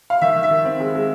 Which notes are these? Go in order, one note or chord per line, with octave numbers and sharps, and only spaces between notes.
F5
D#3 E5
D#3
E5
D#3
C4
G#3
G#3